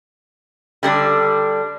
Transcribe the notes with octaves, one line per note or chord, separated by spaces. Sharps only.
D3 G3 D4